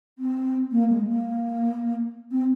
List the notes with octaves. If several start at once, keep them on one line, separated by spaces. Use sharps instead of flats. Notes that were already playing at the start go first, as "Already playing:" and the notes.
C4
A#3
G#3
A#3
C4